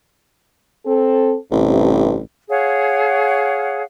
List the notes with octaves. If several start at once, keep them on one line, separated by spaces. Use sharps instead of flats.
C4 A4
A1 G2 C3
G#4 C#5 F5 F#5